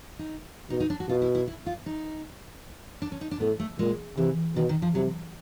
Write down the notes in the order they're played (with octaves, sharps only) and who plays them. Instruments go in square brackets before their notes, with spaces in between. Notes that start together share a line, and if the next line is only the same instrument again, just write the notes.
[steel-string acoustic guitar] D#4
[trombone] B2 [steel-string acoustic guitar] D#4
[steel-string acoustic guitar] D#4
D4
F#4
[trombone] B2 [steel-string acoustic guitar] F4
[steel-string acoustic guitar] E4
E4
E4
F4
D#4
D4
C#4
D#4
D4
[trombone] A2 [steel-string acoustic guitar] B3
[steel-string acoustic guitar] A3
[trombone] A#2 [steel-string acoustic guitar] G#3
[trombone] C3 [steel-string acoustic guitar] E3
[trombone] B2 [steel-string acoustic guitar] D#3
[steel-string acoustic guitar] D#3
F3
[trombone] C3 [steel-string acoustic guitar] F#3